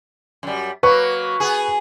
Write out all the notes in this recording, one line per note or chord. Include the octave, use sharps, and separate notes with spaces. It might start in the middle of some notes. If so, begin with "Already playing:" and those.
F#2 G3
F#3 A#3 B4 C#6
B3 G#4